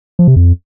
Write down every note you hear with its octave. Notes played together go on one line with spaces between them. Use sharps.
F3
C3
F2